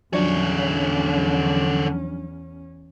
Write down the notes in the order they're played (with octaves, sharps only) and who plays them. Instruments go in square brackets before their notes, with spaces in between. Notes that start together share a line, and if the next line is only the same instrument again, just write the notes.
[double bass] E2 C#4 [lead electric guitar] D3 C#5 [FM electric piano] F3 F#3 D4